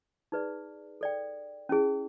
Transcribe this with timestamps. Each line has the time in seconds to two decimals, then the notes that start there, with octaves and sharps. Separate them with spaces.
0.32 D#4 G#4 B4 D5
1.01 A4 D5 G5
1.69 C#4 E4 G#4